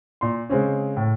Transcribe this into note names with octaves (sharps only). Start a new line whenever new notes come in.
A#2 C6
C#3 G#3 C4 C#4
A2